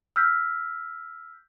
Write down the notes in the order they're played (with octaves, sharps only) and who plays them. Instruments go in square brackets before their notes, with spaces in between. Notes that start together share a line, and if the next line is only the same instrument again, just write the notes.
[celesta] E6 F6 G6 B6